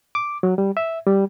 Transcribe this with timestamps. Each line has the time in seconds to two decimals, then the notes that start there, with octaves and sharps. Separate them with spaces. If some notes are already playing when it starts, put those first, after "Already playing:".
0.15 D6
0.43 F#3
0.58 G3
0.77 E5
1.06 G3